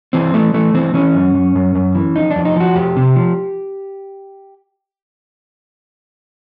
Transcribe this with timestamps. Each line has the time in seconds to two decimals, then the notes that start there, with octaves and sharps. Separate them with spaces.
0.13 E3 C4
0.34 E3 A3
0.54 E3 A3
0.74 E3 C4
0.94 E3 C#4
1.15 F#2
1.34 F#2
1.55 F#2
1.75 F#2
1.95 E3
2.16 F2 D#4
2.31 D4
2.36 F2
2.45 D#4
2.56 F3 F#4
2.75 F2 G4
2.96 C3
3.16 F3